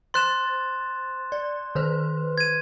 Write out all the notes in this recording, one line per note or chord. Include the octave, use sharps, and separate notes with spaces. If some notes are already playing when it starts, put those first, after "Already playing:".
C5 C6 F#6 A6 E7
D5
D#3 B4 C5
G#6 D#7